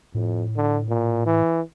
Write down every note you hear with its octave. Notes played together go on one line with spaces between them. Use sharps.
F2 A2
D3
A#2
E3